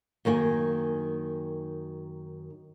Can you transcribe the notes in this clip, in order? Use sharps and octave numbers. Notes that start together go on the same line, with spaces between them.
F#2 D#3 A#3 G#5